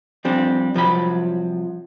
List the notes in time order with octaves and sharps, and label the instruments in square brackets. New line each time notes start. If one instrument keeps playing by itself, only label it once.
[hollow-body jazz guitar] F3 G3 C4 D4
C2 F3 F#3 B5